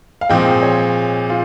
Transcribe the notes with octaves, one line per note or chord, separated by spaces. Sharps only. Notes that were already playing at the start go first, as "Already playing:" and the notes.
F5
A#2 F3 G#3 C4 G5
C#5
F4